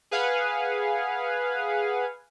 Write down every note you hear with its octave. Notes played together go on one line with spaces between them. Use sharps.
G#4 B4 F5 F#5 G#5